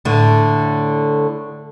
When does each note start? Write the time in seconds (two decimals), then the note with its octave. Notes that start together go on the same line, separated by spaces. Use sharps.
0.05 A2 D3